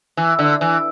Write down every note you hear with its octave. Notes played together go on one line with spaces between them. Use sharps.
E3
D3
E3